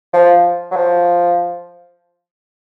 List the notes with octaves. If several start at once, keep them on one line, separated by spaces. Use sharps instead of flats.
F3
F#3
F3